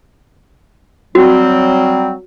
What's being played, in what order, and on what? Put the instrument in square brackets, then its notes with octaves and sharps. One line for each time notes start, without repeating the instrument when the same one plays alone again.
[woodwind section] F#3 G3 C4 [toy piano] F#4